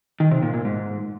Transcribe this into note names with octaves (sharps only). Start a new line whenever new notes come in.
D#3
C3
A#2
A#2
G#2